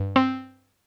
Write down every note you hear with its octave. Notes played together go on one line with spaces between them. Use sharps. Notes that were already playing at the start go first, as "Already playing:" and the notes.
Already playing: G2
C4